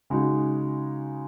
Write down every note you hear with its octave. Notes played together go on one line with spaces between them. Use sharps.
C#3 G#3 D#4 F#4